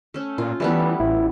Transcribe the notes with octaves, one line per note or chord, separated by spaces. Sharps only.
A3 C#4
A#2 F4
E3 G3 A3 B3
A1 E4